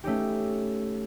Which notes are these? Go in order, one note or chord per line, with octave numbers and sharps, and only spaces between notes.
A3 C#4 D#4 G4